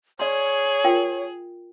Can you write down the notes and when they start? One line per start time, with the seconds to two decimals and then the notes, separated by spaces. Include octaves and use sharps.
0.20 G#4 C#5 D5 C6
0.84 F4 A#4 G5